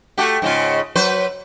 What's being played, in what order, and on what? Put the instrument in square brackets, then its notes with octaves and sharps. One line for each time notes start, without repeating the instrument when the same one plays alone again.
[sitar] A3 F#4 G4
G#2 C#3 F4
F#3 B4 C5